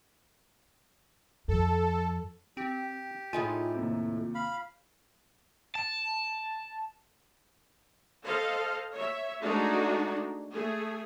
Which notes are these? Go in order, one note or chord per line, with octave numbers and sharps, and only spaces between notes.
F2 A4
C4 G4
A2 D#4 F4 G#4
D#2 C3
F5 B5
A5
A4 C5 D#5 F5
C#5 E5
G#3 A3 D4 D#4 F#4 G#4
A3 G#4